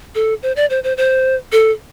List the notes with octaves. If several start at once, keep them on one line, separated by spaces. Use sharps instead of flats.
A4
C5
D5
C5
C5
C5
A4